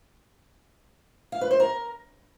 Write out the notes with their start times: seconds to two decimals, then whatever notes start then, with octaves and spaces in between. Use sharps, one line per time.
1.32 F5
1.41 B4
1.51 C5
1.60 A#4